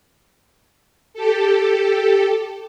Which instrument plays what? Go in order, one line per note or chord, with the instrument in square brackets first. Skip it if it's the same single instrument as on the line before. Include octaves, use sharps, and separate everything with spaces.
[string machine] G4 A4